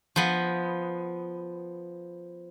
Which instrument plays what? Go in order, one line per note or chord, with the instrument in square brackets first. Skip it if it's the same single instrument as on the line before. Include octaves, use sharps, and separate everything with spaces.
[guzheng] F3 B3